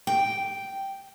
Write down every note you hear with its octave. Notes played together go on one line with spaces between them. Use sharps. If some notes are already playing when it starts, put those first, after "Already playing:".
G5